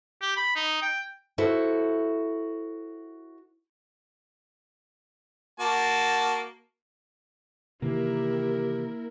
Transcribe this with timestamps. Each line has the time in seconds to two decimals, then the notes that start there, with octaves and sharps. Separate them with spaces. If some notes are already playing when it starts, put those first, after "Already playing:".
0.22 G4
0.37 B5
0.56 D#4
0.82 G5
1.38 E4 F#4 A4 C5
5.60 A#3 F#4 A5
7.82 C3 D#3 E3 A#3 E4 G4 A#4